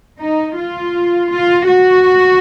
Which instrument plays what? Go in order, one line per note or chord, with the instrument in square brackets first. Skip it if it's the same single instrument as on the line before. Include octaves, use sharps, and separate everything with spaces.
[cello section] D#4
F4
F4
F#4